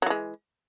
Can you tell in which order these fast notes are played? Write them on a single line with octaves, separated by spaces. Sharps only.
F#3 E3 G#3